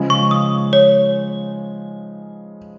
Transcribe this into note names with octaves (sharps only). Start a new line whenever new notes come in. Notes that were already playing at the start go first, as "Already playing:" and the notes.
Already playing: C#3 F3 G#3
C#6
D#6
C#5